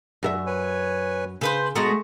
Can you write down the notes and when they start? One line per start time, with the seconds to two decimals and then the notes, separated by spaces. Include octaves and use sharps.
0.23 F#2 A4 E5
0.46 B4 C#5 G#5
1.41 C#3 A4 B4 C5
1.76 B2 G#3 A3 B3 F#4 A#5 D#6